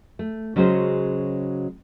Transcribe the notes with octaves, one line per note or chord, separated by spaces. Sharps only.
A3
C#3 F#3 G#3 C#4 F#4 C5